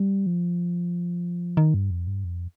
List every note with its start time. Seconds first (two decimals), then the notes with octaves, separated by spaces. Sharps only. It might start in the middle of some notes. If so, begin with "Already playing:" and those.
Already playing: G3
0.26 F3
1.57 D#3
1.74 G2
1.91 F2
2.07 G2
2.24 F2